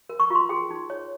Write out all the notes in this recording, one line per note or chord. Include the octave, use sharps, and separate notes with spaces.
A#4
C#6
F4 C6
G#4 G5
D#4
C#5